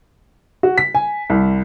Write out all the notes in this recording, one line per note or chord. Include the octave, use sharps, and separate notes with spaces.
F#4
B6
G#5
C2